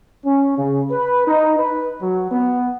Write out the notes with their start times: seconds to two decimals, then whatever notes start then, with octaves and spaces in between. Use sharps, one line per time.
0.25 C#4
0.58 C#3
0.91 B4
1.26 D#4
1.59 B4
2.02 F#3
2.32 B3